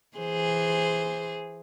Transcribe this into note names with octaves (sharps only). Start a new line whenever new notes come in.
E3 G#4 C5